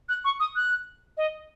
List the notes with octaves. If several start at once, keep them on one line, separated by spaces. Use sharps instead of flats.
F#6
C#6
D#6
F#6
D#5